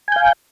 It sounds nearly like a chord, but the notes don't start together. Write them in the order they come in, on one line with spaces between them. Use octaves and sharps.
G#5 G6 F5